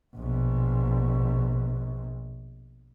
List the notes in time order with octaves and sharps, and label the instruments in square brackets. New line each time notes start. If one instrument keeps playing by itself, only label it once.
[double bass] A#1 B2